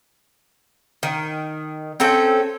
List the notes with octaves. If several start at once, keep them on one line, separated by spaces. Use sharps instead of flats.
D#3
C4 C#4 A4 G5